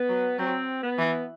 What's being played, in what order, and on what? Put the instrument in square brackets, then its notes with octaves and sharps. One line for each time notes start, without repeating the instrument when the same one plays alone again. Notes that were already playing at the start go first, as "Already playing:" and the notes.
Already playing: [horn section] B3
[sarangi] F#3
[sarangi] F#3 [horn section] C4
[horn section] B3
[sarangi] E3